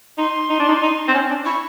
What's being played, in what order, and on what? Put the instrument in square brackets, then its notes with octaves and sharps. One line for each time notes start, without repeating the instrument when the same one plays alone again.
[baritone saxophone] D#4 [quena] C6
[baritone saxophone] D#4
D4
D#4
D#4
C4
C#4
D4
[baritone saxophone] E4 [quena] C#6